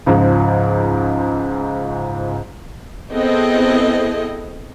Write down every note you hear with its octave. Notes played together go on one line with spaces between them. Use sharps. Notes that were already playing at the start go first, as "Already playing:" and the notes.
C#2 G#2 F3
B3 C4 E4 G#4 A4 D#5